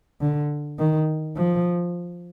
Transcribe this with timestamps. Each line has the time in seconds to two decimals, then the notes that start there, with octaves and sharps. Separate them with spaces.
0.21 D3
0.79 D#3
1.36 F3